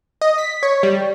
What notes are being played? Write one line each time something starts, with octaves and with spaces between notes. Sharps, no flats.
D#5
B6
C#5
G3